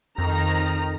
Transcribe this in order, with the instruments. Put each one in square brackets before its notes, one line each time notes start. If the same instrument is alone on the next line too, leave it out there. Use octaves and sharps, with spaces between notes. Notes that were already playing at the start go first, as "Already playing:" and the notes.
[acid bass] F2 [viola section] D#3 A#5